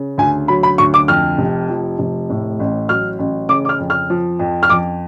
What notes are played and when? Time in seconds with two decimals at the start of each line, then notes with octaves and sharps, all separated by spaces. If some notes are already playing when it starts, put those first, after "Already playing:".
Already playing: C#3
0.18 D2 G#5
0.48 F#3 B5
0.63 B5
0.78 D2 C#6
0.94 D6
1.08 F2 F6
1.38 F1
1.70 F3
1.99 F1
2.30 A2
2.60 A1
2.89 F#3 F6
3.19 A1
3.49 C#3 D6
3.65 D6
3.69 F6
3.79 F2
3.90 F6
4.10 F3
4.39 F2
4.63 F6
4.70 F2 D6